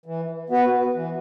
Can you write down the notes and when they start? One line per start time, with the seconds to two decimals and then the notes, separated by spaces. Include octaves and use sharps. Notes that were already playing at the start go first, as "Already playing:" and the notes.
0.06 E3
0.50 B3 F#4 B4
0.94 E3